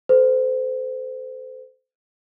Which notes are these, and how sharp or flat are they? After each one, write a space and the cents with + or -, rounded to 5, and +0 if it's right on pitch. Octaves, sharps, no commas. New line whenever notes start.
A4 +0 C5 -30